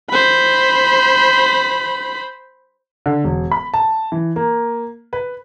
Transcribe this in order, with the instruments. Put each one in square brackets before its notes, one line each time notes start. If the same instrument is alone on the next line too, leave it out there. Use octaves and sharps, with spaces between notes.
[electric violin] C5 B5
[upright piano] D3
E1
B5
A5
E3
A#3
B4